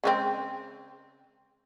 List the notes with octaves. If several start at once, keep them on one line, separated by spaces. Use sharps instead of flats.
C#3 G#3 C4